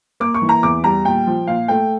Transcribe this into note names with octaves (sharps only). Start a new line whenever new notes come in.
A#3 D6
C#6
E3
A#5
E2 D6
G3 A#5
A#2 G5
F3
A#2 F5
A3 G5